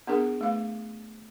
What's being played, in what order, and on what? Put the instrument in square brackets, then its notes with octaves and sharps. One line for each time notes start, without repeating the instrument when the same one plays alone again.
[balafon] B3 D4 G#4 A#4
A3 F5